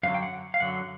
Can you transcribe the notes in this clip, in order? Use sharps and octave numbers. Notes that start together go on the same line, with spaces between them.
F#2 D3 F#3 F5
G5
F#5
F5
F#2 D3 F#3 F#5